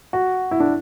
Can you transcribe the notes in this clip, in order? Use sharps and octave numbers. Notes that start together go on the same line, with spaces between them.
F#4
E4
D4